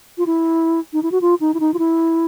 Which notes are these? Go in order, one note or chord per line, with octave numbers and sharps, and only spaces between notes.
F4
E4
D#4
E4
F#4
F4
D#4
E4
D#4
F4
E4